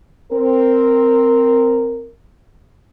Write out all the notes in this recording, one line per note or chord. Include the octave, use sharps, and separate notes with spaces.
C4 A#4